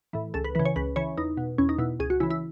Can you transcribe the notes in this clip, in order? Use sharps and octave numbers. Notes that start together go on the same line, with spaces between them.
A2 E3
C#2 A4
B4
C#3 E3 B4
C#5
C#2 B4
C#3 E3 C#5
E2 D#4
B2
E2 C#4
D#4
B2 E4
C#2 G#4
F#4
C#3 E3 E4
E4